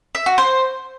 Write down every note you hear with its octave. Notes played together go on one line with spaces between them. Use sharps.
E5
F#4
C5